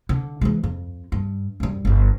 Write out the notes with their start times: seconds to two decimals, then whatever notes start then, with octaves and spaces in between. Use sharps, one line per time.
0.09 D3
0.41 E3 G#3
0.63 F2
1.12 G2
1.60 F#2 G3
1.85 G1 D3